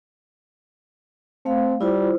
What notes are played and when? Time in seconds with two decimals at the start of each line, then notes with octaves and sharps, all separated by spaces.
1.46 A3 C4 F5
1.81 G3 E4 F4 C5